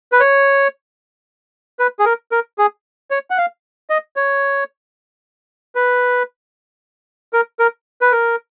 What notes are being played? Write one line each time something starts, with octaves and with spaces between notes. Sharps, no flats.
B4
C#5
B4
G#4
A#4
A#4
G#4
C#5
F#5
F5
D#5
C#5
B4
A#4
A#4
B4
A#4